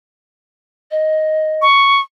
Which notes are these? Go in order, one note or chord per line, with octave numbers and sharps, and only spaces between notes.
D#5
C#6